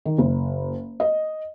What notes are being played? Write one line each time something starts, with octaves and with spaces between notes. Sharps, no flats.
D#3
F#1
D#5